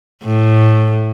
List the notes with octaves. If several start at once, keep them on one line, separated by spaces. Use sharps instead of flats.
A2